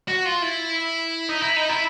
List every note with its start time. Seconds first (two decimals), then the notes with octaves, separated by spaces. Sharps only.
0.08 F#4
0.26 F4
0.42 E4
1.29 D#4
1.42 E4
1.56 D#4
1.69 E4